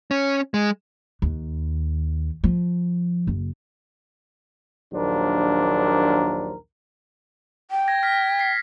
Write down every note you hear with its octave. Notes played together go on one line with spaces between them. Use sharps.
C#4
G#3
D#2
F3
F#1
A#1 D#2 F#3 D4 A#4 C5
G5
G#6 A#6
F6 A#6 B6
B6 C7